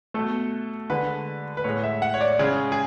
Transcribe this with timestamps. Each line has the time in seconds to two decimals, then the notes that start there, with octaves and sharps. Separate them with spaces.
0.14 B2 A3 A4
0.90 D3 G#3 B4
1.57 B4
1.64 A2 G#3 C#5
1.83 E5
2.02 F#5
2.14 C#5
2.21 D5
2.39 C#3 G#3 G#4
2.72 G#4